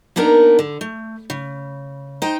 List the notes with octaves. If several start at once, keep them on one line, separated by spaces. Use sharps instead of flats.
A#3 B3 D4 D#4 A#4
D3
A3
C#3
D#4 C5 G5